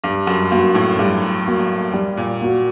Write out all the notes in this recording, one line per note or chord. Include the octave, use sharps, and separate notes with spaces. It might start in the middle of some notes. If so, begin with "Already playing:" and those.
G2 G3
F#2
G2 A#3 F#4
A2
G2 G3
A#3 F#4
G3
A#2
A#3 F#4